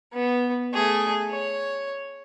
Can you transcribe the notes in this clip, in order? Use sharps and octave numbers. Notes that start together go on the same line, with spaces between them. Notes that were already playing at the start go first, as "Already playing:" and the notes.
B3
A3 G#4
C#5